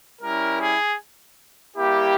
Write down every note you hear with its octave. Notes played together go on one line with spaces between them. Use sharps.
G3 C#4 E4 A#4
G#4
G3 A#3 E4 G4